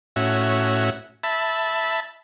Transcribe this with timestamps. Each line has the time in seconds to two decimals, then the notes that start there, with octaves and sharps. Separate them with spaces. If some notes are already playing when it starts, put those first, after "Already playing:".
0.16 A2 C#4 F#4 E5
1.24 E5 A5 B5